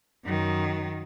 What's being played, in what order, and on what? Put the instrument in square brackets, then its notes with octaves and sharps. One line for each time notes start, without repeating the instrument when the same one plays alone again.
[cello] F#2 D#3